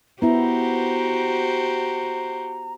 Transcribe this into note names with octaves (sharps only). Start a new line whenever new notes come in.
B3 E4 F#4 G4 C5 A#5